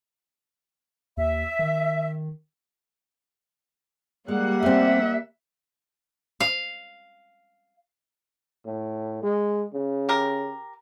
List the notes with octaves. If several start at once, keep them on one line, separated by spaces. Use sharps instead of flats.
D#2 E5
D#3
G3 G#3 A#3 F#5
A3 C4 E5
F5
A2
G#3
C#3
G4 A#4